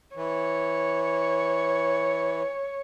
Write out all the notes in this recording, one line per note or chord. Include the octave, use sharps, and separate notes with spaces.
E3 C#5